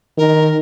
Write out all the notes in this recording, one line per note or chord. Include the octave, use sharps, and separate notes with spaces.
D#3 A#4